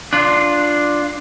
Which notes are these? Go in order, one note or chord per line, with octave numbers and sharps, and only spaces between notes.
D4 F4